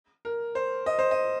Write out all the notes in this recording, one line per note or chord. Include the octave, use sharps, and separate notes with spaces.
A#4
C5
D#5
C5
D#5